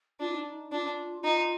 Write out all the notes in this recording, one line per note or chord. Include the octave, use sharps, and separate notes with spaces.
D4 F4
D#4
D4
D#4
D4 F4
D#4 F4